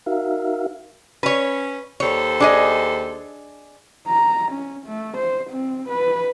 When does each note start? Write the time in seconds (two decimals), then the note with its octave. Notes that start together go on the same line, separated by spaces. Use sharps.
0.06 D#4 F#4 A#4 E5 F5
1.23 C#4 B4 C#5
2.00 D#2 A4 C5 C#5
2.40 D4 G#4 D#5
4.08 A#5
4.52 C#4
4.87 A3
5.18 C5
5.50 C4
5.89 B4